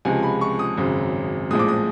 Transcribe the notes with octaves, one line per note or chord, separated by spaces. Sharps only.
C#2 C3 F3 G#3 G#5
B5
C#6
D#6
G#1 F#2 C#3 F#3
A#1 A2 F3 G#3 D#6
D6
D#6